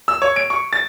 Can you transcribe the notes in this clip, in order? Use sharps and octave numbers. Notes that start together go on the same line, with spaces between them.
E6
C#5
D7
C#6
A6